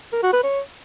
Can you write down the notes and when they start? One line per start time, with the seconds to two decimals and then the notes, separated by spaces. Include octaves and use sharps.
0.13 A#4
0.23 F#4
0.33 B4
0.43 C#5